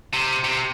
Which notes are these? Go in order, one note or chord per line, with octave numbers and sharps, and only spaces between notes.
C3
C3